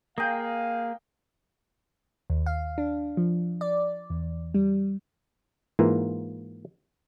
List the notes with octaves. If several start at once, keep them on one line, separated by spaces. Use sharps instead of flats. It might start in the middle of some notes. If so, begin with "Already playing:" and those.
A#3 G#4 D#5 F5 G5
D#2
F5
D4
F3
D5
E2
G3
G#2 E3 A#3 F4